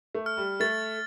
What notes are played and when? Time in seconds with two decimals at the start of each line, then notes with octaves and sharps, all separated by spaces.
0.15 A3
0.26 F6
0.37 G3
0.60 A3 A6